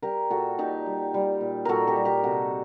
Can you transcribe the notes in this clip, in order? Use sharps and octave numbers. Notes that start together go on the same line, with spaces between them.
G3 G4 A#4
A#2 F#4 A4
A#2 D#4 G4
G3
G3
A#2
A#2 F#4 A4 A#4
G4 A#4
G3
G4 A#4
C3 F#4 A4